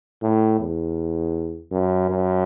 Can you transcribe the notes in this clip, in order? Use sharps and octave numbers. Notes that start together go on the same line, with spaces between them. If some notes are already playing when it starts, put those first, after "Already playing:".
A2
E2
F#2
F#2